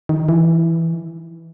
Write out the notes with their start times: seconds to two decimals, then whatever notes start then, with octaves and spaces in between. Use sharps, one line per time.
0.09 D#3
0.29 E3